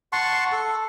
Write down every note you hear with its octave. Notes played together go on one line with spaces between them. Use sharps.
F#5 A5 C6 C#6
A4